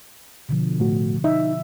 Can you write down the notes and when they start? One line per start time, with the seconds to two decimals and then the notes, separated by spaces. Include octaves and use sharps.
0.49 B2 D3 F3
0.80 A2 A3 F#4
1.24 D#4 E5